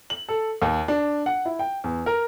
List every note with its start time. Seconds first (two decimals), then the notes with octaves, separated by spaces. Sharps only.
0.10 F#7
0.29 A4
0.62 D#2
0.88 D4
1.26 F#5
1.45 E4
1.59 G5
1.84 E2
2.06 A#4